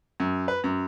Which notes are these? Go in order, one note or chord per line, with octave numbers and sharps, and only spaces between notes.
F#2
B4
F#2